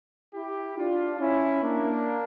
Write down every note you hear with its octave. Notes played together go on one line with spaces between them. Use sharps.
E4 G4
D4 F4
C#4 E4
A#3 D4